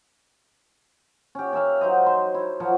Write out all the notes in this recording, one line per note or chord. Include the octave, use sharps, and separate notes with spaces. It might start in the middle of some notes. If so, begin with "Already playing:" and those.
C#4 G4
C#4 A#4 E5 F5
F#3 D#4 C5 D#5
C5 C6
E4
F3 F#3 A#4 C#5